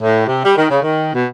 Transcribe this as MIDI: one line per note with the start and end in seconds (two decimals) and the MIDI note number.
0.01 0.24 45
0.27 0.42 48
0.45 0.56 55
0.57 0.67 51
0.70 0.80 49
0.83 1.13 51
1.13 1.26 47